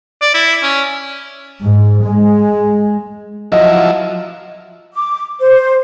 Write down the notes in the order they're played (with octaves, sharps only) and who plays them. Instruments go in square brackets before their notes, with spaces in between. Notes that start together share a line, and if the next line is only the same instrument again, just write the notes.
[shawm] D5
E4
C#4
[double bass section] G#2
G#3
[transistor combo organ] F3 F#3 E4 [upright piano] D#5
[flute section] D6
C5